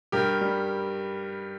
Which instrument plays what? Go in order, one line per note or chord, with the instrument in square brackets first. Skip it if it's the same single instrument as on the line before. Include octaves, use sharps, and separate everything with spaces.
[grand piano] G2 G4 A#4
G3